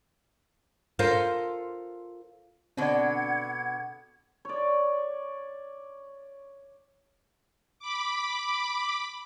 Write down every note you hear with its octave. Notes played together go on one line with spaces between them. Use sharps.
F4 A4 A#4 C5
B2 D3 C4 D5 F#5 G#6
C#5 D5
B5 D6